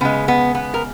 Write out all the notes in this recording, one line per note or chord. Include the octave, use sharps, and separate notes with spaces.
C#3 G#3 B3
B3
B3
A#4